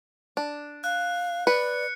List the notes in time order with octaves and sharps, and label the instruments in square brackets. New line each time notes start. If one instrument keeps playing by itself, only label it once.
[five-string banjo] D4
[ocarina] F5 [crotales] F#6
[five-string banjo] B4 [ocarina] D5 [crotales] C#7